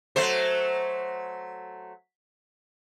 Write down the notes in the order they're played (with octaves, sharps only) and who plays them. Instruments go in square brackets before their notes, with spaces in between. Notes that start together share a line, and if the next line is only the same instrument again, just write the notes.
[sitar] F#3 A3 C5